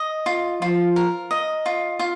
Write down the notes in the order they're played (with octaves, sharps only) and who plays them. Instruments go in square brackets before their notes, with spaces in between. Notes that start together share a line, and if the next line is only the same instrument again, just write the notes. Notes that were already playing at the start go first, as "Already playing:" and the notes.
Already playing: [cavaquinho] D#5
F4
[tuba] F3 [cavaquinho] F4
[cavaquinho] A#4
D#5
F4
F4